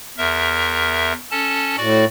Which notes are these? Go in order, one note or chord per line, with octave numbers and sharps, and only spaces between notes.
E2 A#4 E5
C#4 A4 A5
A2 F#4 D5